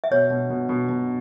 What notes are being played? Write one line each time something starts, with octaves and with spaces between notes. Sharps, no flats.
E5
B2 C#5
B2
B2
B2
B2